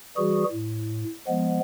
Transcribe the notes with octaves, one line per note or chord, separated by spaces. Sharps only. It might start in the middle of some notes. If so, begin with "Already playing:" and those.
E3 G3 F#4 G#4
A2
F3 G#3 B3